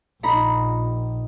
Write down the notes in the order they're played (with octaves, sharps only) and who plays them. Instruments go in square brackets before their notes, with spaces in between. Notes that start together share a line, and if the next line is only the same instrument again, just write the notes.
[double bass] A#1 [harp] D#4 A#5 B5